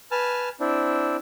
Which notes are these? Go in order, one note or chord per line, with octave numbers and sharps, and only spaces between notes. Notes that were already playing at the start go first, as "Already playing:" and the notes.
B4 G#5 A5 F6
C4 D4 E4